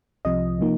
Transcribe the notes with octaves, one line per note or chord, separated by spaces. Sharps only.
C2 C3 F3 D#5
C3 F3 A#3 D#4